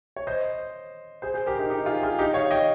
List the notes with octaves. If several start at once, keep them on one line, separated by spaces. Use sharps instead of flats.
C#5
C5 D#5
G#4 C5
G#4 C5
G4 A#4
D#4 G4
D#4 G4
F4 G#4
F4 G#4
D#4 G4
C#5 F5
D#5 G5